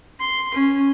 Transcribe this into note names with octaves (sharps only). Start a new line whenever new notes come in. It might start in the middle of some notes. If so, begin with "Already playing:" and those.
C6
C#4